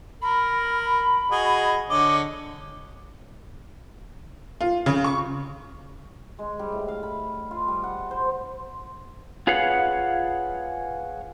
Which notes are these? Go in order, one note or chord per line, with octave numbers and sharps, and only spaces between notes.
A#4 B5
F#4 G#4 D#5
D3 C#5 D#5 D6
F4
C#3
C#6
G#3
G3
A2
F5
B5
F4
G3
F#5
C5
F4 G#4 B4 C#5 F5 F#5